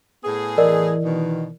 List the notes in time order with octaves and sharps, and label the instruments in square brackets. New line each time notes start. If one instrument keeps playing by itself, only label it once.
[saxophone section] A2 B3 G#4
[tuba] E3 [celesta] A#4 D5 D#5
[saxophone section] B2 D#3